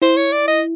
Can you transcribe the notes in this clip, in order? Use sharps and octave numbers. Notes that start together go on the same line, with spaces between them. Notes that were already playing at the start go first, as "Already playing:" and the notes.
E4 C5
C#5
D5
D#5